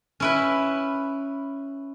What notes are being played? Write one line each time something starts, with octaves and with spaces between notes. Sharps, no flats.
C#4 E4 B4